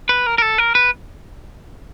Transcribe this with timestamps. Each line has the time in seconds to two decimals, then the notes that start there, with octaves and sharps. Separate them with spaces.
0.09 B4
0.26 A#4
0.38 A#4
0.42 A4
0.58 A#4
0.75 B4